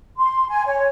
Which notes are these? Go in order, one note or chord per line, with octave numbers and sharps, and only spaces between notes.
C6
G#5
C#5